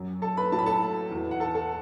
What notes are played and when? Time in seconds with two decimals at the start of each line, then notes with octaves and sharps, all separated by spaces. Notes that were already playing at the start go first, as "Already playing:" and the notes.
Already playing: F#2 F#3
0.22 A4 A5
0.37 B4 B5
0.52 A2 F#3 A5
0.59 B5
0.66 A4 A5
1.11 E2 E3
1.31 F#5
1.40 A4 A5
1.55 A4 A5